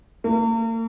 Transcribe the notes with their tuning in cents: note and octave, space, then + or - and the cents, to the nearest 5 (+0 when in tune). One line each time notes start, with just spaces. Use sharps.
A#3 -45